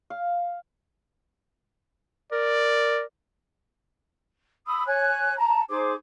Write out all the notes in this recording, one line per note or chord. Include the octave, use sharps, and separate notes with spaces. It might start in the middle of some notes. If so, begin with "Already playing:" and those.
F5
A#4 D5
B5 D#6 E6
C#5 G#5 F#6
A5 A#5
D#4 G#4 C5 D6